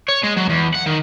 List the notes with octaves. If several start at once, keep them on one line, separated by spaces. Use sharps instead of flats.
C#5
G#3
F#3
E2
F#5
D#3